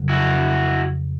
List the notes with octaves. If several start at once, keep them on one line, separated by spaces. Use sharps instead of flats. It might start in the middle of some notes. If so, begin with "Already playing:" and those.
Already playing: F2 C#3 F#3
E4 F#4